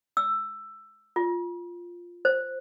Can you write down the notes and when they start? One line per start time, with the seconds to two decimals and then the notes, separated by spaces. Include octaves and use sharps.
0.17 E6
1.16 F4
2.25 C5